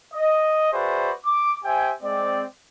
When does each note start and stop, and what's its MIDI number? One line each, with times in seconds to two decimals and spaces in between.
0.14 0.72 75
0.73 1.12 66
0.73 1.12 68
0.73 1.12 71
0.73 1.12 72
0.73 1.12 74
0.73 1.12 76
1.26 1.57 86
1.65 1.92 67
1.65 1.92 72
1.65 1.92 76
1.65 1.92 79
1.65 1.92 80
2.03 2.44 56
2.03 2.44 60
2.03 2.44 74